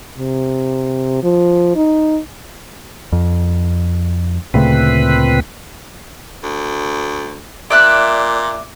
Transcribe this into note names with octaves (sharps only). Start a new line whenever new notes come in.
C3
F3
D#4
F2
D2 A#2 C#3 A3 C4 B4
D2
A#2 D5 E5 F#6